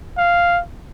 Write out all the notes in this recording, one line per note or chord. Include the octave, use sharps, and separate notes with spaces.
F5